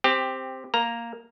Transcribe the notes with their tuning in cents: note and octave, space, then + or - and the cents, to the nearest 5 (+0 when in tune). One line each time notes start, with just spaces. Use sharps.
C4 +0 G4 +10
A#3 +0 A#5 +0